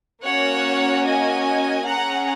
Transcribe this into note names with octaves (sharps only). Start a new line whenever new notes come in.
A#3 C#4 F#4 C#5 F#5
D#5 G#5
C#4 G#4 F#5 A#5